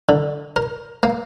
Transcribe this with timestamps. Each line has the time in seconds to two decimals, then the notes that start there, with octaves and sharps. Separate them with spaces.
0.09 D3
0.56 A#4
1.03 A#3